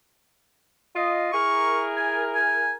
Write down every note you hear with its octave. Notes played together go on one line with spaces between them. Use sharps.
F4 D#5
E4 G#4 A#4 C#6
G#5
G#5